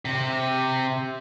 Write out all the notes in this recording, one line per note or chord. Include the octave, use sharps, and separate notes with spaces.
C3